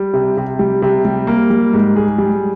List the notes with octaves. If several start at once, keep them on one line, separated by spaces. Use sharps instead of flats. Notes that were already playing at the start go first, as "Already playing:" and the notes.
Already playing: G3
C3
C3
G3
C3
G3
A#3
G3
G#2
G#4
G3